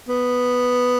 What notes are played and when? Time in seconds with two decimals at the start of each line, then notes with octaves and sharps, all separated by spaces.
0.09 B3